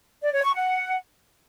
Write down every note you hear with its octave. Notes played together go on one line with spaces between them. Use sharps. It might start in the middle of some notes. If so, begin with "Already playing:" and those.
D5
C#5
C#6
F#5